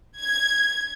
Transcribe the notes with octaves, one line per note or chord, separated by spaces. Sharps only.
G#6